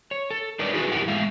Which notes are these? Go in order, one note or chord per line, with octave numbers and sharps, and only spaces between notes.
C#5
A4
D4 D#4 A#4 B4 C#5 D5
D#4 E4 F#4 G#4 B4
F2 E4 G4 A#4 F#5
A2 G#3 E5 F5